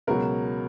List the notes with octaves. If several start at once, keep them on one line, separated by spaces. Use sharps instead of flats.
C#2 B2 F#3 A#4